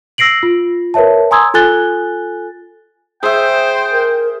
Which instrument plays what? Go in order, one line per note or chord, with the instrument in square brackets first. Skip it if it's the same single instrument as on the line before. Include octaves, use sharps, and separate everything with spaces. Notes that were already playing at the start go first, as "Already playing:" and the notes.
[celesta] E6 A#6 C7 D7 F#7
F4
A#4 B4 C#5 E5 A5
G#5 A#5 C6 D#6 E6 G#6
F4 A4 G#5 F#6 A6 G7
[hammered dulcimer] G#4 E5 [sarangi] C5 [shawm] G5
[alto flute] A#4